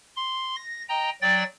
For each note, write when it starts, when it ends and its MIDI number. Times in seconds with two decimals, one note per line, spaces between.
0.16 0.56 84
0.56 0.82 94
0.89 1.10 75
0.89 1.10 79
0.89 1.10 82
1.22 1.44 54
1.22 1.44 74
1.22 1.44 79
1.22 1.44 93